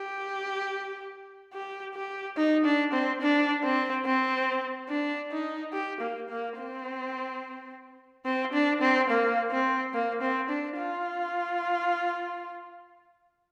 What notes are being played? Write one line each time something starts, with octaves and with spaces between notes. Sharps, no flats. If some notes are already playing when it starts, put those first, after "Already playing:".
Already playing: G4
G4
G4
D#4
D4
C4
D4
C4
C4
D4
D#4
G4
A#3
A#3
C4
C4
D4
C4
A#3
C4
A#3
C4
D4
F4